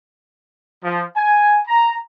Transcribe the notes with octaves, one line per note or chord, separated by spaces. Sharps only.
F3
G#5
A#5